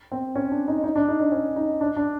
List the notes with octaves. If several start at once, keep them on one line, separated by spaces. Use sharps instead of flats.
C4
C#4
D4
D#4
D#4
D4
D#4
D4
C#4
D#4
D4
D4